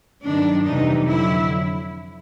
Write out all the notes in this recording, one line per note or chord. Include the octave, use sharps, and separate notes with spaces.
G2 D#3 F#3 D4
F2 C3 E3 G3 D#4
F2 D3 F#3 E4